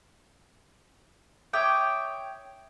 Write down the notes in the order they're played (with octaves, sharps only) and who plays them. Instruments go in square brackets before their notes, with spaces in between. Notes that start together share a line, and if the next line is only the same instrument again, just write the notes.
[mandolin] C#5 G5 [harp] E5 D6 D#6